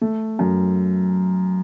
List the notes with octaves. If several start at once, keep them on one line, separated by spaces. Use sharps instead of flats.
A3
F#2